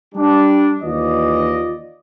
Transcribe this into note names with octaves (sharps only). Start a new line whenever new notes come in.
G3 D4
D#2 E3 F4 D5 D#5